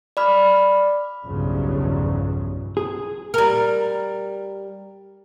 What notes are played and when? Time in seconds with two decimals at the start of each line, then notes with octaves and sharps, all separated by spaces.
0.17 D5 B5 F6
1.26 B1 E2 G2 C#3 F3 F#3
2.77 G#4
3.34 G3 A#4